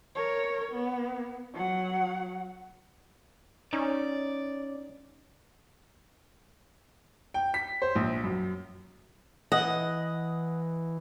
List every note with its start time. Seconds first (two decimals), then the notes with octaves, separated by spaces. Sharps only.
0.15 A#4 C#5
0.71 B3
1.54 F#3 F#5
3.73 C#4 D#4 D5
7.34 G5
7.54 B6
7.82 C5
7.95 A#1
8.24 F#2
9.52 E3 D#5 F#5